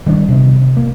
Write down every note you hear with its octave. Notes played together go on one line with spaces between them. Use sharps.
D#3 G3 A#3 D4
C3 B3
A#3